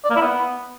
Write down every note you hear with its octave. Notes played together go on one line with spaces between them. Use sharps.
D5
A#3
E4
B3